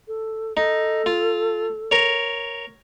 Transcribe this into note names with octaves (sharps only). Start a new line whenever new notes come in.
A4
D#4 A4
F4
A#4 C#5